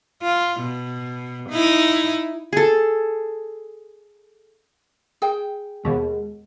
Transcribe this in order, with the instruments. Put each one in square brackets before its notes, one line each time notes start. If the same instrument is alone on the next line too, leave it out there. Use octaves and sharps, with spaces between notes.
[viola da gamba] F4
B2
D#4 E4
[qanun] G#4 A4
[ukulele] G#4 G5
[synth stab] D#2 B2 [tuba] G#3